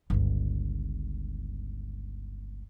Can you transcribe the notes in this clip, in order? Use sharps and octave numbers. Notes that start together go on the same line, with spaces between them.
G1 C#2